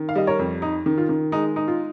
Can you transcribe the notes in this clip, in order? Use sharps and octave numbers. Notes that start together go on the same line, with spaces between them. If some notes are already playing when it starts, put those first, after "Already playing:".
Already playing: D#3
F5
G3 D#5
A#4 C#5
F2
D#4
D#3
F4
D#3
G#3 D#4
D#4
F4